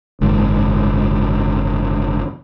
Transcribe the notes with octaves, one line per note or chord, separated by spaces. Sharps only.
F#1 G#2 D#3